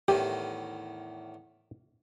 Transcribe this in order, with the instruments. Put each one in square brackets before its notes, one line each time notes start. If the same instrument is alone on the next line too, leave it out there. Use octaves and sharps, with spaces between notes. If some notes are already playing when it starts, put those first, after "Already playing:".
[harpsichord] E2 A2 D#3 [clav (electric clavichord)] G4